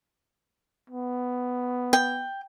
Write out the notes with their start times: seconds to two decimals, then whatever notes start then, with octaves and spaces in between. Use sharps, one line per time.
0.90 B3
1.93 G5